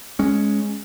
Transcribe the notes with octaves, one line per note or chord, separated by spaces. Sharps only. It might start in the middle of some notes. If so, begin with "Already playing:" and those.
G#3 C#4